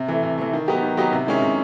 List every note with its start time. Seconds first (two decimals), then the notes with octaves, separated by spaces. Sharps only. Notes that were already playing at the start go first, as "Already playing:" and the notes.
Already playing: C3
0.08 E3 A3
0.23 C3
0.38 E3 A3
0.53 D#3
0.68 F#3 B3 D#4 G4
0.82 D#3
0.97 F#3 B3 D#4 G4
1.13 C3
1.27 D#3 G#3 C#4 E4
1.42 C3